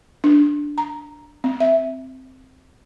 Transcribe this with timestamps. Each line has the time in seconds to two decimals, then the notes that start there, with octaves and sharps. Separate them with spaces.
0.24 D4
0.78 A#5
1.44 C4
1.60 E5